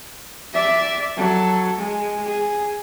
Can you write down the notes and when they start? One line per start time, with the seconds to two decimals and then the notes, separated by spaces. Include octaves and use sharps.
0.54 D5 E5
1.16 F#3 A4
1.78 G#3
2.26 G#4